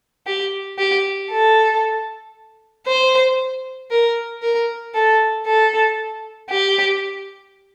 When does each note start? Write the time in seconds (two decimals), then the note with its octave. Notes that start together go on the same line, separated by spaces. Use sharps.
0.26 G4
0.79 G4
1.31 A4
2.87 C5
3.91 A#4
4.42 A#4
4.94 A4
5.46 A4
6.50 G4